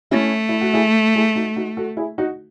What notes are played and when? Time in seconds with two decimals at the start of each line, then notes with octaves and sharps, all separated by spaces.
0.11 A3 C#4 E4
0.49 E4
0.61 F#4
0.74 E4 G#4
1.15 E4 G#4
1.36 D#4 F#4
1.56 D#4 F#4
1.77 F#4 A4
1.97 E4 G#4
2.18 D#4 F#4